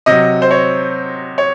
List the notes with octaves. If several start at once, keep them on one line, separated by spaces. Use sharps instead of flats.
C3 F#3 D#5
C5
C#5
C#5